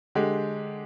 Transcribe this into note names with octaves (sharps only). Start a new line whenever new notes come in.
D3 G#3 G4